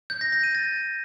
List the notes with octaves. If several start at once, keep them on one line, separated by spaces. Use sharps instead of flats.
G6
A#6
A#6
D#7
A6